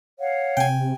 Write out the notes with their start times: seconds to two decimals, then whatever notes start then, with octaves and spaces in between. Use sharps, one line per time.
0.20 C#5 F5 F#5
0.57 C3 G5 G#5